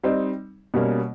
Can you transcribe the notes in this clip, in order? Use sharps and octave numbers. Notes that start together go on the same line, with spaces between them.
G3 C4 D#4
B2 G3 A#3 C#4